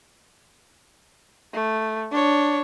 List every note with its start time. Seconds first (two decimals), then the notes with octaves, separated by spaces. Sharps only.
1.53 A3
2.11 D4 C#5